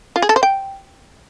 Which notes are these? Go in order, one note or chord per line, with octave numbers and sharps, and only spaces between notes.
F4
G#4
A4
C5
G5